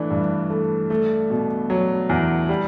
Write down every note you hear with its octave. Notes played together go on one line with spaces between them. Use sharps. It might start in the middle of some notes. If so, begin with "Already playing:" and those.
Already playing: E3 A3 D4
G2
A3
A3
B2
F#3
E2
G3